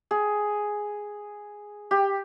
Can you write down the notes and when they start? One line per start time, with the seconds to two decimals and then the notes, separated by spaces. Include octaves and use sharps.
0.11 G#4
1.91 G4